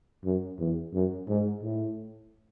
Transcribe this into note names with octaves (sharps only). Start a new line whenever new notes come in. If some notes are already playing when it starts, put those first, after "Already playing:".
F#2
E2
F#2
G#2
A2